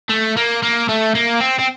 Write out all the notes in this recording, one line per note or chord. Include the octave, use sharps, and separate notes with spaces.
A3
A#3
A#3
A3
A#3
C4
C4